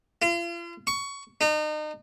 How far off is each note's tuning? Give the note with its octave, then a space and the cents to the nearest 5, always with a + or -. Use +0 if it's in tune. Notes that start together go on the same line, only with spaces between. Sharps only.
F4 -40
C#6 +15
D#4 -35